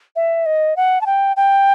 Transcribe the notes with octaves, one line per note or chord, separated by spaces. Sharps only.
E5
D#5
F#5
A5
G5
G5